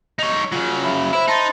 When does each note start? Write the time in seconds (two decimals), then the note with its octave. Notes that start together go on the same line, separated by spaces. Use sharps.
0.19 D#4 C#5
0.52 C#3 F#3 F4
0.84 E5 B5
1.13 E4 C5 B5
1.28 D#4 A5 C6 A6